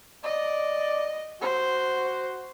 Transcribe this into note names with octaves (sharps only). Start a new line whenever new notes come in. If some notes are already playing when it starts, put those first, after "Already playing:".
D5 D#5
F#4 C5